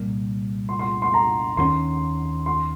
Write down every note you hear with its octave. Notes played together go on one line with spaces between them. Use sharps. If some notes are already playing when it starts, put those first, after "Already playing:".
Already playing: C2 A#2 G3 A#3
C6
C6
C6
A#5
D#2 D#3 G3 C#4 C6
C6